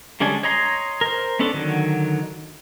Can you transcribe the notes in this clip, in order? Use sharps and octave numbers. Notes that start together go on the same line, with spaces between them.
D3 G3 G#3 C#4 D4
C#5 D#5 A#5 C6
A#4 C5
B3 C#4 D4 A4
D3 D#3 F#3